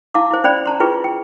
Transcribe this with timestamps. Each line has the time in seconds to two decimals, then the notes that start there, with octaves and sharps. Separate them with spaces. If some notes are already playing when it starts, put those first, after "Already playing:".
0.14 E4 F5 A5 D6
0.31 E4 C5
0.44 C#4 C5 D5 G5 B5
0.66 A5 A#5 C6
0.80 E4 F4 G#4 B4 G5 C#6
1.04 G5